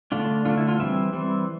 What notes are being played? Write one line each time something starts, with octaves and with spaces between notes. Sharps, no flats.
D3 A3 D4 F4
D3 A3 D4 F4
E4
F4
E3 G3 C4 E5
E3 G3 C4